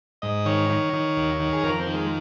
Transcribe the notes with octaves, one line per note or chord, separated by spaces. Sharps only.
G#2 D#5
D#3 C#5
D#3
D#3
D#2
D#3
G#4
F2 A#4
C4
D#3
G#3